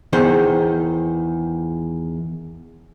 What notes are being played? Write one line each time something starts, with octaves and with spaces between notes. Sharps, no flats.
E2 D#3 C5